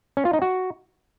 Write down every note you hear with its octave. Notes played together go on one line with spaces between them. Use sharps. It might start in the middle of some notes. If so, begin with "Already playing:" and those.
C#4
F4
D#4
F#4